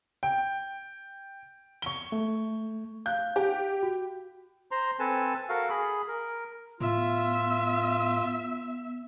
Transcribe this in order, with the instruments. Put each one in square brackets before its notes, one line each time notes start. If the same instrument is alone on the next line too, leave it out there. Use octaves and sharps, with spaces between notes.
[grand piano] G5
C#6 G7
[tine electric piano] A3
[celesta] F5 F#6 [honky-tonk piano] G6
[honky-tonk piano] G4
[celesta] F#4
[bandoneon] C5 A#5 C6
C4 A4 B4 G#5 A5
F#4 A4 A#4 F5
G#4 B5
A#4
[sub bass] A2 [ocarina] B3 [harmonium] F4 [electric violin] E5